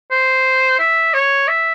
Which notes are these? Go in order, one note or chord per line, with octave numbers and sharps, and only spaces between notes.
C5
E5
C#5
E5